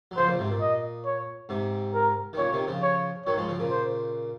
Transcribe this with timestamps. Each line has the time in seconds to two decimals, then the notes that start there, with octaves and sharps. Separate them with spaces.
0.11 F#3
0.17 C#3 F3 C5
0.28 A#2 C#3
0.39 G#2 C3
0.50 A#2
0.61 D#5
1.05 C#5
1.49 G#2 C3
1.94 A#4
2.33 D#3
2.38 A#2 C#3 C#5
2.53 C3 D#3
2.67 C#3 F3
2.83 C#5
3.26 D#3 F#3 C#5
3.37 F3 G#3
3.48 C#3 F3
3.59 A#2 C#3
3.70 C5